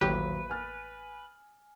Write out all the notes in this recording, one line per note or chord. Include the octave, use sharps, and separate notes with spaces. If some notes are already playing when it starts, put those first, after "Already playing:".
D#1 A1 F#3 G4 B4
G#5 F6 A6